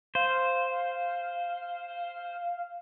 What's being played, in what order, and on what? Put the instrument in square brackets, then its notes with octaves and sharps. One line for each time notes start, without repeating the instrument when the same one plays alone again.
[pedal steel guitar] C5 [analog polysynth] F5